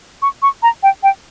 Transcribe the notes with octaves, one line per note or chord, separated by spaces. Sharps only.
C#6
C#6
A#5
G5
G5